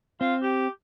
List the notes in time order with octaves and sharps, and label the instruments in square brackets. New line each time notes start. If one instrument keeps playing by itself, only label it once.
[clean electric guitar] C4 [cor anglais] F4
[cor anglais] G4